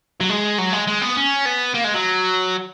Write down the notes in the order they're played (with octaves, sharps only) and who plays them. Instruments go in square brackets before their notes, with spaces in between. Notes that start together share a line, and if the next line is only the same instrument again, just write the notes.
[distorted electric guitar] F#3
G#3
F#3
G#3
G#3
B3
C#4
B3
A#3
G#3
F#3